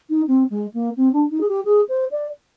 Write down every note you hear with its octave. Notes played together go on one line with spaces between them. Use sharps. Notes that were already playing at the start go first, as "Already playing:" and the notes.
D#4
C4
G#3
A#3
C4
D4
D#4
G#4
G4
G#4
C5
D5